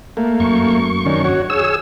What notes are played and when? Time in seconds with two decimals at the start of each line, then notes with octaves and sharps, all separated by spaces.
0.17 A3 A#3
0.40 F#2 C#6
1.06 D#3 C#4 D4
1.24 F#4 C#5
1.50 G#4 C#5 E6